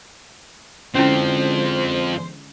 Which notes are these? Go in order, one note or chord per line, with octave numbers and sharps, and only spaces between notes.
D3 F3 G#3 C4 C#4 E4 C5